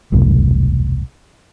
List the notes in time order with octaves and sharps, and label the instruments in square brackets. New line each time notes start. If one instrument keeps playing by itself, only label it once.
[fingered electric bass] E1 C2 F#2 A2